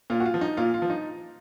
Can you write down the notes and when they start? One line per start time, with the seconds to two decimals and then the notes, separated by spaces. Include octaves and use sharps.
0.10 A#2 F4
0.20 F#4
0.26 F4
0.34 F3
0.41 D#4
0.57 A#2 F4
0.74 F4
0.82 F3
0.90 D#4